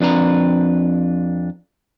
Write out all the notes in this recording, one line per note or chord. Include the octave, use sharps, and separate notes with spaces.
F2 D4 B4 A#5